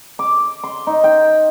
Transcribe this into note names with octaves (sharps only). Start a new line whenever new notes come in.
D6
C6
D#4
G5